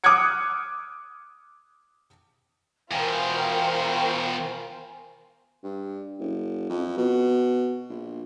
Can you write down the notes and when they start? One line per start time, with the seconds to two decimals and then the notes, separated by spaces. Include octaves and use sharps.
0.04 D6 D#6 F6 F#6 G#6 C#7
2.91 E2 B2 F4 A#4 C5 G5 G#5
5.63 G2
6.19 F#1
6.69 F2
6.97 B2
7.89 A#1